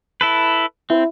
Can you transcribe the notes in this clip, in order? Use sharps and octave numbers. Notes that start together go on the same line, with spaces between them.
E4 A4 B4
C4 E4